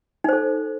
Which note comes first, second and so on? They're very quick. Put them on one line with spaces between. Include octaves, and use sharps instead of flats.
D#4 C5 A4